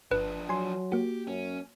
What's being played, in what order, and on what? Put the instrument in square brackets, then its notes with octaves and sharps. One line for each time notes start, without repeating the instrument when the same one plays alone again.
[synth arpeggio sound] G1 [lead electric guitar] F3 D4 [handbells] B4
[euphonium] F#3 [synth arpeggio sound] G#5 C6
[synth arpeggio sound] A#3 F#4 [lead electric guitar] G4
[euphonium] F#2 [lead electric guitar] C#4